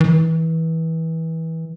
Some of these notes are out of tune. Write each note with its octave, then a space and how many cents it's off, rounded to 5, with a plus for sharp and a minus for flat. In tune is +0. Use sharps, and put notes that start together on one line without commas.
E3 -25